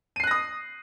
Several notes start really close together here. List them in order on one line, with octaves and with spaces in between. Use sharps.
D#7 C7 F#6 A#6 D#6